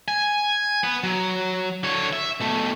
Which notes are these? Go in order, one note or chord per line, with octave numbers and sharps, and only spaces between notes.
G#5
B3
F#3
D3 C#5
E5
B2 A3